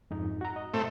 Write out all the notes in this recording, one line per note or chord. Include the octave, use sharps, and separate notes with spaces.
F2 G#2 D#4
F#4 A#5
D#5
A2 A3 C4